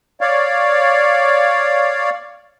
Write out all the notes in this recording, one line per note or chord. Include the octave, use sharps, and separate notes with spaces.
C#5 D5 F5